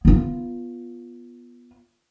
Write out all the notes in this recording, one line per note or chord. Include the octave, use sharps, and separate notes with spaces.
B3 F4